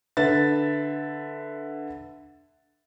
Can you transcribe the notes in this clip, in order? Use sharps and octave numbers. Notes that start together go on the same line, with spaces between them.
D3 B4 E5 A6